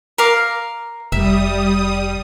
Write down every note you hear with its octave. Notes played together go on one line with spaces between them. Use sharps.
A#4 F5 D6
F1 G3 E5 D#6